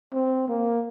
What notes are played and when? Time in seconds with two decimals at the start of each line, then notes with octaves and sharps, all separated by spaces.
0.13 C4
0.48 A#3